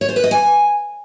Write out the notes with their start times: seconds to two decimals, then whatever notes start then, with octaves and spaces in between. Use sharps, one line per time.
0.01 C#5
0.09 C5
0.16 B4
0.24 D#5
0.31 G#5